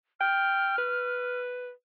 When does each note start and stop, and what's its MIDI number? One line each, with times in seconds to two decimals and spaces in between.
0.20 0.77 79
0.20 1.40 89
0.78 1.71 71